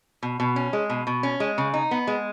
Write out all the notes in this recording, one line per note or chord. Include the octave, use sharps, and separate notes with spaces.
B2
B2
C#4
G#3
B2
B2
C#4
G#3
C#3
D#4
B3
G#3